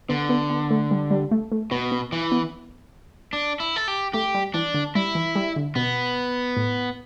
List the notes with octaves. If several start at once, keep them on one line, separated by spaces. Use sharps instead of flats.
D3 B3
B3
B3
A3
G3
G3
A3
A3
B2 B3
B3
E3
B3
D4
E4
A4
G4
A3 G4
G3
E3 D4
D3
G3 E4
E3
G3
D3
B2 B3
A2